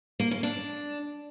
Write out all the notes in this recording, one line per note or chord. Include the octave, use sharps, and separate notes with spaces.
A#3
C#4
D4